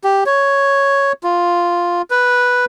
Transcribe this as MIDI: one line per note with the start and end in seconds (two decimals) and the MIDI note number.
0.04 0.24 67
0.26 1.12 73
1.23 2.02 65
2.10 2.65 71